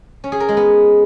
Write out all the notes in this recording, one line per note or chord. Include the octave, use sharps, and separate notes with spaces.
C#4
G#4
A#4
G#3
B3